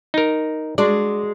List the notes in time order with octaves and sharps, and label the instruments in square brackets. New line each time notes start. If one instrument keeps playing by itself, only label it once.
[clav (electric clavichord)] D#4 A#4
[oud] G#3 D4 F#4 [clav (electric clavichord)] D5